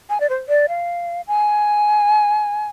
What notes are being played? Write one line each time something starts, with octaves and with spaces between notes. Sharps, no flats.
G#5
D5
C5
D5
F5
G#5